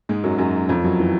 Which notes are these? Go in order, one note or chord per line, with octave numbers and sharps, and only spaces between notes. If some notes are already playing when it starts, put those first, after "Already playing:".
G#2 G#3
F#2 F#3
F#2 F#3
F2 F3
F#2 F#3
E3